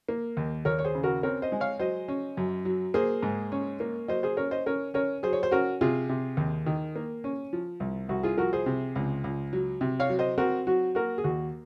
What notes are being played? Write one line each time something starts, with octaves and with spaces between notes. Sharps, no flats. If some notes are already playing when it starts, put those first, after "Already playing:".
A#3
D#2
D#2 A#4 C#5
C#5
G#4 C5
C#3
F#4 A#4
C4 A#4 C#5
C5 D#5
G#3
C#5 F5
F#3 C5 D#5
C#4
F#2
F#3
A#3 G#4 C5
G#2
C#4
A#3
F#3 C5 D#5
G#4 C5
C#4 A#4 C#5
C5 D#5
C#4 A#4 C#5
C#4 A#4 C#5
F#3 G#4 C5
C#5
C5
C#4 F#4 A#4
C3 F4 G#4
C3
D#2
D#3
A#3
C#4
F3
C2
C2 F#4
F4 G#4
F3 F#4 A#4
G#4 C5
C3
C#2
C#2
F#3
C3
C#5 F5
F#3
C5 D#5
C4 F#4 A#4
F#3 F#4
A#3 F#4 A#4
G#4
D#2 F#4